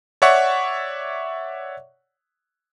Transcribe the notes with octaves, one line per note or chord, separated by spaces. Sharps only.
C#5 D5 E5 F#5 C#6